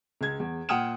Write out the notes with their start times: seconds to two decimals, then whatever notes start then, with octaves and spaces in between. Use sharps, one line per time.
0.21 C#2 G#6
0.39 E2
0.69 A#2 F#5 G5 D#6 F6 E7